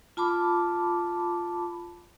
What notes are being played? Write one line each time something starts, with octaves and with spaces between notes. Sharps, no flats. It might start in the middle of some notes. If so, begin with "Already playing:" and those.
F4 A5 B5 D6